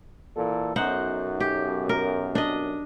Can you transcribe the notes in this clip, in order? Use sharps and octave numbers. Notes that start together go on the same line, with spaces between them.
A#2 E3 A4
B1 F#2 D#4 C5 F#5
G4
A#4
D4 D#5